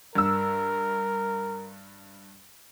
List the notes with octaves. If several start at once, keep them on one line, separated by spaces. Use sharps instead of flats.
G2 A#4 E6